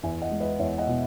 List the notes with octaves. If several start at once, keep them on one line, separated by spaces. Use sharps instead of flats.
E2 E5 G#5
D#5 F#5
G#3
B4 D#5
E2 C#5 E5
D#5 F#5
B2